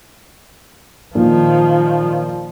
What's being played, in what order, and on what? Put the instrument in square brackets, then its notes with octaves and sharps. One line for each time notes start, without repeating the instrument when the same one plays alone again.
[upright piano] A#2 [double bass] D#3 F3